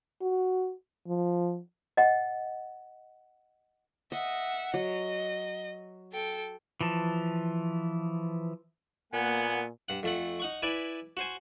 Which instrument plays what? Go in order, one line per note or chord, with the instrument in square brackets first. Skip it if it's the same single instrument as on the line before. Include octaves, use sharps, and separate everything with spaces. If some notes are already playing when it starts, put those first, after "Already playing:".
[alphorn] F#4
F3
[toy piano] D#5 F#5
[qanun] D#5 [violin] E5 F#5
[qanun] F#3 [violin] D#5
[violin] A4 G5
[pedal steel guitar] E3 F3 A5
[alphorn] A#2 [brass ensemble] A#3 F#5 [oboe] B3 [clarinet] G#5
[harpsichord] G2 F#5
F2 A3 F#5
D#4 F#5 C#6
E4 B4 D5 G#5
F#4 C5 G#5